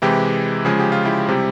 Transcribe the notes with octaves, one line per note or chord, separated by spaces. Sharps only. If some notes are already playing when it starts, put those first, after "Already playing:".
C3 E3 G#3 E4 G4
C#3 F3 G#3 G#4
G4
F4
E4 G4
C3 G3